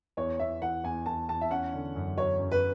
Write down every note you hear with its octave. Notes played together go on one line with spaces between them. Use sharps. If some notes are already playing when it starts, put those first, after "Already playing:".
E2 C#5
E2 E5
E3 F#5
E2 G#5
E3 A5
E2 A5
E5
C#4 F#5
D3
F#2
F#3 C#5
F#2
B4